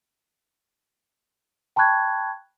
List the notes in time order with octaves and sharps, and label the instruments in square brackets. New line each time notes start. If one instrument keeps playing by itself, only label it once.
[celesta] G5 A5 B5 C#6 F#6 G#6